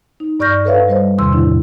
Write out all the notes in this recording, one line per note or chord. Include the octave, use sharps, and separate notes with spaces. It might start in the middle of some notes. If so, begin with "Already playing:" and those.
D#4
G2 D5 C#6 F6 G6 A#6
A4 B4 C#5 E5 F5
G3 C5 D#5
E2 C3 D#3 C6 E6
A2 D3 D4 E4